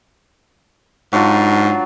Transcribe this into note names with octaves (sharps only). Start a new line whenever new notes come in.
G#2 F#3 D4 F4